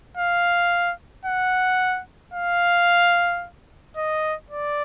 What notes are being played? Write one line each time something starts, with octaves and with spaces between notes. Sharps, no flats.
F5
F#5
F5
D#5
D5